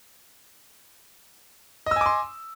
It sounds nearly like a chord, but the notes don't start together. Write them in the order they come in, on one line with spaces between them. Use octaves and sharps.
D#5 E6 G#5 D6 C6